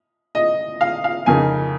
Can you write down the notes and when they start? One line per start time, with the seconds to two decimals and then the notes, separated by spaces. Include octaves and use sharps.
0.35 D#5
0.81 F5
1.04 F5
1.26 F2 C#3 A#3 D#4 G#5